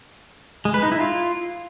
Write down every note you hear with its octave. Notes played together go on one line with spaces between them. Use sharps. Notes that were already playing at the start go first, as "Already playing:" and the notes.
G#3
B4
D#4
E4
F4